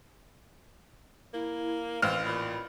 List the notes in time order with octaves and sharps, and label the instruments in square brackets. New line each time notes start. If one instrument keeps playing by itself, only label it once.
[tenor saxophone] A#3 [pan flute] E4
[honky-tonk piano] A1 F6 [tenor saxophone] C4 [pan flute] F5
[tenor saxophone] A#2 [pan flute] B5